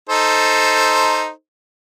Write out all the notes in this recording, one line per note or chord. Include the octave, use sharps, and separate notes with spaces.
D#4 A4 C5